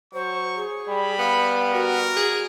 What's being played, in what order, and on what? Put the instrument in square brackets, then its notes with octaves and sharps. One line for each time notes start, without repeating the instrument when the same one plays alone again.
[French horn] F#3 [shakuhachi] C5 [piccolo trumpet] C#6
[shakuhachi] G#4
[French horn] G3 [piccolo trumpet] B5
[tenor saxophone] B3 [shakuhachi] F5
[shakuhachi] F#4 [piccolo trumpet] A#4
[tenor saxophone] G#4